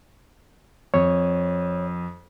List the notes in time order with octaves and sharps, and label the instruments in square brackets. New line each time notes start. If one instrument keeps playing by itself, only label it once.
[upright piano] F2 [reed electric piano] C#5